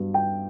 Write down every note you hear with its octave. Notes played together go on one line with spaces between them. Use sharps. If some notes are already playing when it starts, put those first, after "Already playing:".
Already playing: G2 F#3 B3 D4
G5